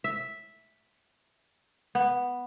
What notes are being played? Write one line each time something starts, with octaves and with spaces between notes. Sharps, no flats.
E5
B3